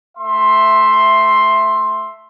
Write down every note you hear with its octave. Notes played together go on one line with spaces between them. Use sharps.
A3 E5 C6